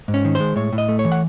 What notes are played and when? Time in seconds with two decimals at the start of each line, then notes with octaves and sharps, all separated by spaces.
0.08 G#2
0.14 C#4
0.25 D#3
0.35 C5
0.40 G#3
0.56 A2 C#5
0.73 A2
0.78 D#5
0.88 A3
0.99 C#5
1.05 E3
1.12 F#5